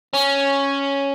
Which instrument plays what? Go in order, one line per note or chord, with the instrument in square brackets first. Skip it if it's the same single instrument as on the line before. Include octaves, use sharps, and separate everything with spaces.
[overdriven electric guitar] C#4